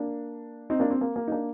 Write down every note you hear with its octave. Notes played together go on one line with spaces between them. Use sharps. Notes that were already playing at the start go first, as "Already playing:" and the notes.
Already playing: A#3 D4
C4 D#4
A#3 D4
C4
A#3
A#3
D#4
A#3 D4